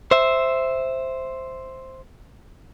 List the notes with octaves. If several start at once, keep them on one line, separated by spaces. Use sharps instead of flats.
C5 E5